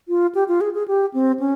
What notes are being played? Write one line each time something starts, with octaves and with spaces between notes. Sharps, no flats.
F4
G4
F4
G#4
G#4
G4
C4
C#4